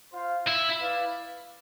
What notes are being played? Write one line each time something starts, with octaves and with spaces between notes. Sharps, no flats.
F4 C5 F5
E4
E4 B4 D5 F5